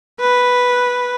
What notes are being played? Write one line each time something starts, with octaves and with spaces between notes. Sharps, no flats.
B4